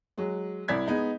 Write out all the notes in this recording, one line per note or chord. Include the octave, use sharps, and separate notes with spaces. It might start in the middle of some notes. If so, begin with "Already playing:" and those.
F#3 G#3
C2 E4 D5 G#6 B6
G#3 B3 D#4